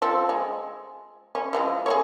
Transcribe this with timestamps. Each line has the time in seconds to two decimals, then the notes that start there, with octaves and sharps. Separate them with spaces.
0.02 F3 C4 A4
0.29 G#3
1.35 C#4
1.53 E3 F3 G#3
1.86 G#4 A4 C#5